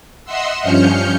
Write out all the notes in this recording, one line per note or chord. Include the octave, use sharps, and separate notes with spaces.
D#5 E5 F#5 C6 E6
G2 F3 C#4 F6 G6 C#7